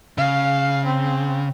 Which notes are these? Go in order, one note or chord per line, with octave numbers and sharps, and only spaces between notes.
C#3 F5
C4